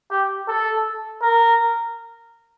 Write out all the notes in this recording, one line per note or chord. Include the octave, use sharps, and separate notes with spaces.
G4
A4
A#4